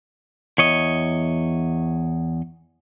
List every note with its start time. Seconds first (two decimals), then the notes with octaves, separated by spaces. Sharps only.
0.58 E2 C#5 D#5